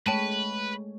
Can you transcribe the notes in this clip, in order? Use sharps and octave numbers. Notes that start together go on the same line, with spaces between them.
G#3 A3 B4 C#5 G5 A5 D#7